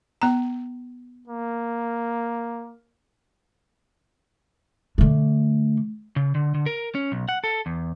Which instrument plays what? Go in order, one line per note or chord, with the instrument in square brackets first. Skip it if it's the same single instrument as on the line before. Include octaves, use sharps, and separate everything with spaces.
[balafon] B3 A#5
[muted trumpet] A#3
[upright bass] D3 A3
[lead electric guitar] C#3
D3
D3
A#4
C#4
B1
F#5
A4
E2